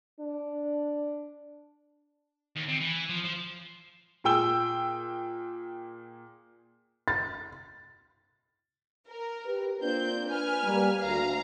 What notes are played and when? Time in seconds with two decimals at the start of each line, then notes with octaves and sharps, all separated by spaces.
0.20 D4
2.56 D#2
2.69 C3
2.81 E3
3.09 F3
3.24 F3
4.24 A#2 G#4 G5 E6 G7
7.08 A6
9.08 A#4
9.45 G4 B4
9.81 A#3 C4 D4 F4 G6
10.29 B4 G#5 F6
10.63 G3 A#3
11.04 D2 F5 A#5